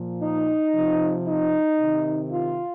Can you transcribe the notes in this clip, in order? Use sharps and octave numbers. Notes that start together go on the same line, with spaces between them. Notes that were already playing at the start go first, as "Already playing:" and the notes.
Already playing: A#2 F3
D#4
C3 F3
D#4
C3 D#3
F4